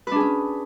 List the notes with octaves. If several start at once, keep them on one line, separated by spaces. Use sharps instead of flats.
C#4 D4 G#4 B4